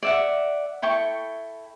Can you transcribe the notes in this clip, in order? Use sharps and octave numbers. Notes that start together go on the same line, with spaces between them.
D5 E5 F#5
E4 A4 G5 C#6